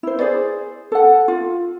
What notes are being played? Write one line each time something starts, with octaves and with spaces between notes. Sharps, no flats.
E4 C5
G#4 C5 D5
A4 F#5
F4